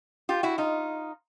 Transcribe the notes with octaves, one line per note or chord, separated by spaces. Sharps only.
F4 G4
E4 F#4
D#4 F4